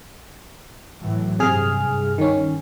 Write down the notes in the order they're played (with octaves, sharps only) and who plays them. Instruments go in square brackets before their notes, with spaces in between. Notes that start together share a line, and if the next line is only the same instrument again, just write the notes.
[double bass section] A2 E3 F#3
[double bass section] G2 [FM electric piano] C3 G#4 F6
[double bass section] G2
[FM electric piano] D#3 C#4